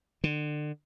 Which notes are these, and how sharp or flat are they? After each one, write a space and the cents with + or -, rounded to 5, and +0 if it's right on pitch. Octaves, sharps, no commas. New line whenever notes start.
D3 +30